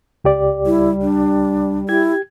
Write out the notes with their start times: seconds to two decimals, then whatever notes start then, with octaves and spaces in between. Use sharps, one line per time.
0.24 C#2 G4 D5
0.66 G3 E4
1.02 D4
1.89 E4 G4 G#6